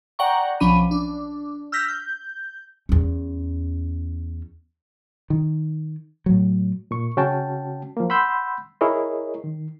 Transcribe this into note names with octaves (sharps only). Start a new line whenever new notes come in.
D5 F#5 G5 A#5 C#6
B1 F3 C#4 D4 B5 D#7
D4
E6 F6 G6 A#6 B6
G6
E2 C#4
D#3
A2 F#3
A#2 C#6
C#3 C#4 F#4 G5 A5
F3 A#3
F#5 B5 C6 E6 G6
E4 G#4 A#4 C#5 D#5
D#3